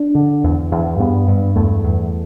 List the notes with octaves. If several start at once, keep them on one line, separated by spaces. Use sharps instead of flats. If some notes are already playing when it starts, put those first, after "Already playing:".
Already playing: D4
D3
E2
E2
G2 B3
G2
E2 A3
E2